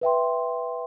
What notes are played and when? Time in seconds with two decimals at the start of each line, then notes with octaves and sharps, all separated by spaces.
0.01 B4 E5 G5 C6